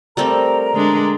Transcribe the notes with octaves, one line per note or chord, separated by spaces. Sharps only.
G3 A3 C4 A#4 A#5
D3 G#3 D4